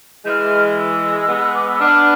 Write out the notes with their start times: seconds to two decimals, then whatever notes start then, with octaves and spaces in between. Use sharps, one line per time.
0.25 E3 G#3 F6 G6
0.77 E6
1.29 G#3 B3
1.54 D6
1.67 E6
1.80 B3 D4 F6